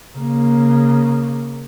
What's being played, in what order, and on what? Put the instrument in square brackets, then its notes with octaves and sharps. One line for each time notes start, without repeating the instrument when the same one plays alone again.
[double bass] C#3 A#3